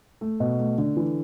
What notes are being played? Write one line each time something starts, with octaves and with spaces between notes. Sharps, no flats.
A3
B2
A3
D3
E3